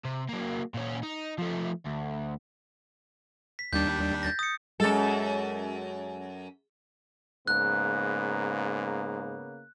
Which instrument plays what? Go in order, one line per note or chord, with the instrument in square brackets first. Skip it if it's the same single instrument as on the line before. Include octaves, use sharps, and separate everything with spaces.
[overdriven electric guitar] C3
F#3 A#3
A#2 C#4
D#4
F3 A3
D2
[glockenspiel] B6
[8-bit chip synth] D#2 G3 D4 [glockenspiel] G6
[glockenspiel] G6 A6 A#6
D#6 C#7
[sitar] F#2 A4 [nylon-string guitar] G#3
[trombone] G#2 [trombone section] C#3 A#3 B3 [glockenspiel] F#6